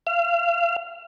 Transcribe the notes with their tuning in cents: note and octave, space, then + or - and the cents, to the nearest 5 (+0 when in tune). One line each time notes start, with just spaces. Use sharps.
F5 -35